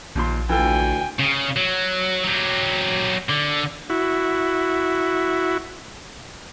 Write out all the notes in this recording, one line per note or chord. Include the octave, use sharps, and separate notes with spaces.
A#1 D#2 A#2 C6
D2 E3 F4 A4 G5 G#5
C#3
F#3
F#3 G4
D3
E4 F#4